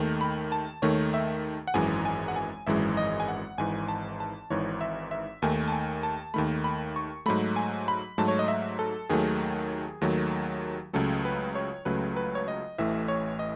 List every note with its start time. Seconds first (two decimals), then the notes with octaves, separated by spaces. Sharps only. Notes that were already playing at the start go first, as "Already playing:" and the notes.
Already playing: D#2 D#3 A3
0.21 B5
0.52 A5
0.82 D#2 D#3 A3 C#5
1.14 E5
1.67 F#5
1.74 G#1 F#2 E3 G#3 G#5
2.05 G#5
2.28 F#5
2.36 G#5
2.67 G#1 F#2 E3 G#3 E5
2.97 D#5
3.20 G#5
3.28 F#5
3.58 G#1 G#2 E3 G#5
3.88 A5
4.20 A5
4.50 G#1 G#2 E3 C#5
4.81 E5
5.11 E5
5.42 D#2 D#3 A3 G#5
5.68 A5
5.72 G#5
6.03 A5
6.34 D#2 D#3 A3 B5
6.64 B5
6.96 C#6
7.26 G#2 F#3 A3 B5
7.56 G#5
7.88 B5
8.18 G#2 F#3 A3 A5
8.28 C#5
8.39 D#5
8.48 E5
8.79 A4
9.10 D#2 D#3 F#3 A3 G#4
10.01 D#2 D#3 F#3 A3
10.93 C#2 C#3 F#3 A3 A4
11.25 B4
11.55 C#5
11.85 C#2 C#3 F#3 A3 B4
12.16 B4
12.35 C#5
12.48 D#5
12.78 A1 A2 E3 A3 E5
13.08 C#5
13.39 D#5